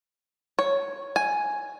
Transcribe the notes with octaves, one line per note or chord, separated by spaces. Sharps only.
C#5
G#5